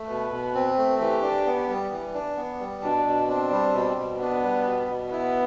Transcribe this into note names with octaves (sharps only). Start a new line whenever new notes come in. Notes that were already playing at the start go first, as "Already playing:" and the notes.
Already playing: A3
B2 B4
B2
C4
A3
E3 G4
D4
B3
G3
E3
D4
B3
G3
B2 D4
B2
C4 D4
G3
B2
B2
B3 D4
G3
B2
B2
B3 E4